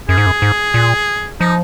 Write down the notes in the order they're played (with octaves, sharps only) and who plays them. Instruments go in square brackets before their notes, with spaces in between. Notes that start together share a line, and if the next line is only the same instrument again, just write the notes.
[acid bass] F#2 [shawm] G#4
[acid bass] G#2
F#2
G#2
A#2
[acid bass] F3 [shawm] D#4